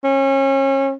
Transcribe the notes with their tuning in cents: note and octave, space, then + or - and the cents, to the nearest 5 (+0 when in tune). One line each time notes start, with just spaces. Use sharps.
C#4 -30